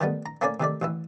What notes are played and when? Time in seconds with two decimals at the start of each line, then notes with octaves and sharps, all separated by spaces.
0.01 D#3 G3 A3 B3
0.26 A#5
0.41 A3 A#3 C#4 C#5 D5
0.60 C3 D#3 A3 D5
0.82 A1 E3 E4